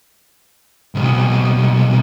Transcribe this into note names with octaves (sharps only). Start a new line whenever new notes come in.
C2 B2